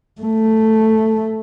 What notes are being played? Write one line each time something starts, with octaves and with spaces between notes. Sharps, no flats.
A3